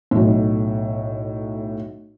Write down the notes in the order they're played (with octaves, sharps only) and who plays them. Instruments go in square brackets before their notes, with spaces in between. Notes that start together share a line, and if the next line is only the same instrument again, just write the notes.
[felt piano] B1 A2